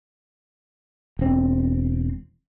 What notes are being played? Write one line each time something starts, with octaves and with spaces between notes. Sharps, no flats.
E1 C4